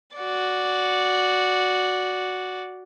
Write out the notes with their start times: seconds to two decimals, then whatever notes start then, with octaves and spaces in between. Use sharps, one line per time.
0.16 F#4 D5